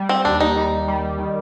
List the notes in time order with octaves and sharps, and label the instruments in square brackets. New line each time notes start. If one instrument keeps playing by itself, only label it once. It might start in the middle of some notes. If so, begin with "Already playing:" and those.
Already playing: [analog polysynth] G3
[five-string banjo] C4
[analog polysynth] D#2 [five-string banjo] D4
[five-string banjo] D#4
[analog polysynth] G3
G3
D#3